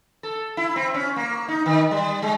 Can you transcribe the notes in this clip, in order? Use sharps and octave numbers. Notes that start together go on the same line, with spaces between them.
A4
E4
C4
C#4
A#3
D#4
D#3
G3
G#3